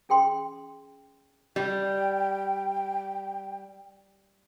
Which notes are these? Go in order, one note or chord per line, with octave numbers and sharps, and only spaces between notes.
C#4 G#4 G5 C6
G3 G5